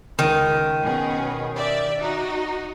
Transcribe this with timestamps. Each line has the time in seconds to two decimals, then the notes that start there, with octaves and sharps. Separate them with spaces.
0.19 C#2 D#3
0.84 B2 C#4 G#4
1.56 G4 D5 E5
1.98 D#4 F#4